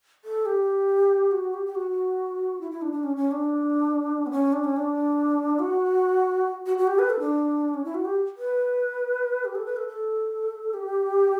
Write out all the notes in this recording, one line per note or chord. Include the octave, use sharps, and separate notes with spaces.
A4
G4
F#4
G4
G4
F#4
E4
E4
D4
D4
C#4
C#4
D4
B3
C#4
D4
C#4
D4
F#4
F#4
F#4
G4
B4
A4
D4
C#4
E4
F#4
G4
B4
G4
A4
B4
A4
A4
G4